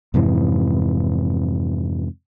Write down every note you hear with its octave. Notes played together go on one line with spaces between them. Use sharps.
F2 G#2 C3 E3